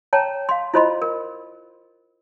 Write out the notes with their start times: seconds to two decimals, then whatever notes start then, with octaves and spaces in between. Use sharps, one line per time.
0.13 C#5 G5 A5 A#5
0.49 F5 C6
0.74 E4 F4 C5 D#5 B5 C6
1.02 A#4